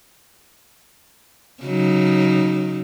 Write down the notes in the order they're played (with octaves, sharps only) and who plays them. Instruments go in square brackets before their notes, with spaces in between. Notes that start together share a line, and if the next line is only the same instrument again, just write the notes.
[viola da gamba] C#3 F#3 D#4